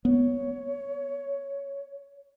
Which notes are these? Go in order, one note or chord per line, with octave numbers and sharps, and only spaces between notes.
B3 C#5